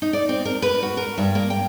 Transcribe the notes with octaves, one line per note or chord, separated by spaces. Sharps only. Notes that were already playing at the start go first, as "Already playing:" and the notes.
D#4
D5
C4
A#4
B4
F#4
A#4
G2
A#3
G5